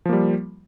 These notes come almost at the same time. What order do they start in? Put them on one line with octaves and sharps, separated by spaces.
F3 A#3 G3